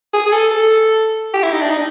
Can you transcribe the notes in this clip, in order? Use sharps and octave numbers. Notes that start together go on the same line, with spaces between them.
G#4
G#4
A4
A4
G4
E4
D#4
D4
D#4